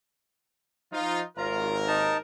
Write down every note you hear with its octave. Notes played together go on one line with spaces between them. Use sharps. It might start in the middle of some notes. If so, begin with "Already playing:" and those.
F3 D#4 F4
G#1 D#2 F4 A#4 A#5
D#4 A5